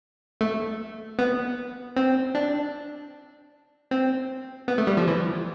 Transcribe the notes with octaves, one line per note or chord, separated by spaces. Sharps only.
A3
B3
C4
D4
C4
B3
A3
G3
F3
E3